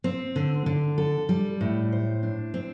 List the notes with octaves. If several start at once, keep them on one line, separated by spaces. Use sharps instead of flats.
C4
D3
D3
A4
G3
A2
C5
D4
C4